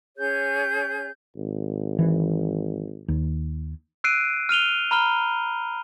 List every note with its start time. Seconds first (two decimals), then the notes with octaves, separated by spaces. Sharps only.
0.16 C#4 G#4 C#5 G6
1.37 G#1
1.99 E3
3.08 D#2
4.04 E6 F#6 C7 D7 D#7
4.49 F6 D#7 F7 G7
4.91 A#5 B5 F6 G7